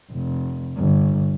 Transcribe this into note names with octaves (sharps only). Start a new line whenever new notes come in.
F1
G1